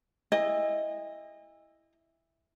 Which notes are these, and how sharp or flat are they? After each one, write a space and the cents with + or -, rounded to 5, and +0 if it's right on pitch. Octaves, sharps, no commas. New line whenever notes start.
E4 +0 D#5 +0 G#5 -40